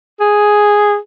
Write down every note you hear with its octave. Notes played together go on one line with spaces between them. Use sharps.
G#4